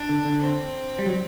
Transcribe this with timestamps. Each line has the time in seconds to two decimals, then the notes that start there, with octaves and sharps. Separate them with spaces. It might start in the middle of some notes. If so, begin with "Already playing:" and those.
Already playing: D4
0.09 D3
0.25 D3
0.42 C4
0.99 G3
1.06 F#3